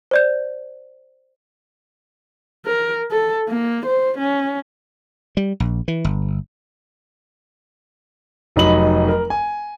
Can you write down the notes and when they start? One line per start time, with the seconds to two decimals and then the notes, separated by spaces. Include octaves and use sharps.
0.11 C5 D5 G6
2.66 A#4
3.11 A4
3.49 A#3
3.86 C5
4.18 C#4
5.37 G3
5.60 A#1
5.88 E3
6.04 G1
8.56 F1 F#3 D#4 D#5 B5 F#7
9.08 A#4
9.30 G#5